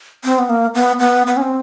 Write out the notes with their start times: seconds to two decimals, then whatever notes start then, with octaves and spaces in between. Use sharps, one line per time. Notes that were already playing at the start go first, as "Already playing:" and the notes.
0.24 C4
0.39 B3
0.49 A#3
0.75 B3
0.99 B3
1.27 B3
1.37 C#4
1.42 C4